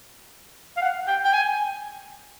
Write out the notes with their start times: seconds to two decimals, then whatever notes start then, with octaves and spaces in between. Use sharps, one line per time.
0.77 F5
0.82 F#5
1.07 G5
1.25 G5
1.34 G#5